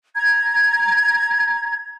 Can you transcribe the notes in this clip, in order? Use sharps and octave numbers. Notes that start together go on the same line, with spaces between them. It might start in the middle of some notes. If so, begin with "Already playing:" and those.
A#5 G#6